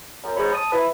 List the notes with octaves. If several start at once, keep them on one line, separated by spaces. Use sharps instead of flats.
F#2
G#2 G#3 C#5 B5
A5 D#6
E4 B4